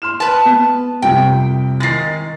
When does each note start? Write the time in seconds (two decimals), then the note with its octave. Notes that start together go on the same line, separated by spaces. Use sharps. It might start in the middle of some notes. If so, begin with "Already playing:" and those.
0.02 C6 F6 E7
0.20 B4 A5
0.45 B3
1.02 C2 F2 C3 G5
1.80 D#3 G#3 A6 A#6 C7